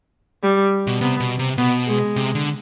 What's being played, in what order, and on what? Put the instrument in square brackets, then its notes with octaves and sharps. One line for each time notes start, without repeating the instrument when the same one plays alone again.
[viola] G3
[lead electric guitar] B2
[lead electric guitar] C3 [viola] B3
[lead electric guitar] B2
C3
[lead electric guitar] B2 [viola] B3
[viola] G#3
[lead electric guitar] C3
D3